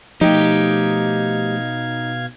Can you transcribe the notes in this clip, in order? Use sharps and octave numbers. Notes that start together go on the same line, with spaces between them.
B2 F3 A3 D#4 G4 F5 G5 G#6